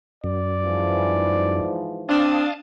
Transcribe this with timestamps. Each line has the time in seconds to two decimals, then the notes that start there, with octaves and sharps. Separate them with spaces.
0.24 F#2 D5
0.62 G#2 E3 F3
2.09 C4 D4 F5 A5 D#6